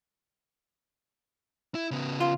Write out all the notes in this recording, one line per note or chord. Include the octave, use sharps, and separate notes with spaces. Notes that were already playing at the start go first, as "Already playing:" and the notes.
E4
C#3 B3
F4